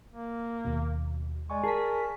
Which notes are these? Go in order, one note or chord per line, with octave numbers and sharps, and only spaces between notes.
A#3
D#2 B2
G#3 D5 G#5 C#6
G#4 A#4 A5 B6